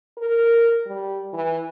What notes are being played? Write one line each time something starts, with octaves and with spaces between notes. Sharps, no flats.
A#4
G3
E3